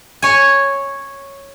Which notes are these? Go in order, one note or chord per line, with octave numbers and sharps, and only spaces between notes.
C#5 G#5